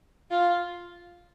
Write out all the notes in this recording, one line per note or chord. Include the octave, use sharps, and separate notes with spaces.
F4